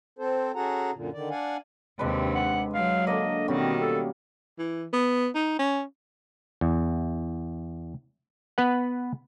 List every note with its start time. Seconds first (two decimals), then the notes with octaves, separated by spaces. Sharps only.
0.19 C4 A4 C5
0.55 C#4 F#4 G#4 A4 F#5 A#5
0.93 F#2 A#2 D3
1.13 D3 D#3 D5
1.30 D4 D5 F5 F#5 G#5
1.99 D#2 C3 G#3 D4 B4
2.35 F#5
2.74 F#3 F5
3.07 D3 A#3 D#5
3.48 B2 D#3 G3 C4 C#4 F#4
3.81 A4
4.59 E3
4.93 B3
5.35 D#4
5.59 C#4
6.61 E2
8.58 B3 B4 F#5